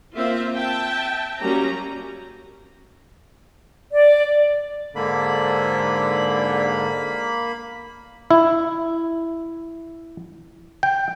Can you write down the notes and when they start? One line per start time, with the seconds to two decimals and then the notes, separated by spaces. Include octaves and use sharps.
0.15 A#3 C4 F4 E5
0.57 E5 G5 A5
1.40 F#3 G3 A#3 C#4 A#5
3.92 D5
4.96 G#2 D3 A#3 B5
8.31 E4
10.83 G5